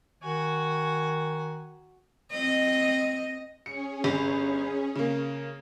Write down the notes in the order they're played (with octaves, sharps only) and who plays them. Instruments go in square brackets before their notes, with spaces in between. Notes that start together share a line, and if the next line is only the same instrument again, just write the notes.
[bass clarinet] D#3 [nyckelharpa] F#4 G#5
[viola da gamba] C4 D#5
[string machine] C#4 G#4 [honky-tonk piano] C#7
[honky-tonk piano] G1
C#3 A#3